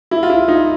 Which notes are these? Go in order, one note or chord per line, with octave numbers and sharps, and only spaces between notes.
E4
F4
E4
D#4